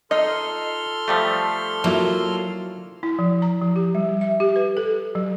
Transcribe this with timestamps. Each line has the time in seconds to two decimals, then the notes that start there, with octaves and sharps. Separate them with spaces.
0.11 D#4 F4 A4 D#5 C6 F6
1.08 F3 G3 A3
1.84 F#3 A#3 E4 F4
3.03 E4
3.19 F3
3.42 A#5
3.62 F3
3.76 G4
3.95 G3
4.21 E5
4.40 G4
4.56 B4
4.77 A4
5.15 F#3